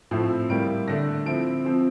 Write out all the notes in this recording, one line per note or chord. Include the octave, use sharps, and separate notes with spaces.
A2 F3 A3 C4 E4
A2 G3 A#3 E4 D7
D3 A3 D4 A#6
F3 C4 E4 D7
C3 F3 C4